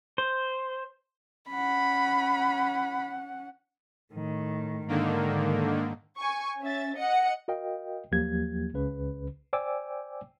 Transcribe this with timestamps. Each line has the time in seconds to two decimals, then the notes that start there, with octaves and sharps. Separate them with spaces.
0.18 C5
1.50 C#4 F#5 B5
4.14 A2 D#3
4.88 G#2 D3 D#3 A#3
6.18 G#5 C#6
6.61 C#4 E5 A6
6.96 D#5 F#5 C#7
7.48 F#4 A#4 D#5 F5 G5
8.12 D#2 F3 F#3 A#3 G4 G#6
8.73 C#2 C#3 B4
9.53 C5 D5 G5 G#5 D6 E6